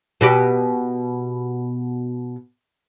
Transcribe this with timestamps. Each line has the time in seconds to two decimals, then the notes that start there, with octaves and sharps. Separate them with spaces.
0.21 B2 F#4 G4